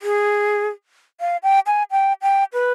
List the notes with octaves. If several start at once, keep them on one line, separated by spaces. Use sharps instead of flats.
G#4
F5
G5
G#5
G5
G5
B4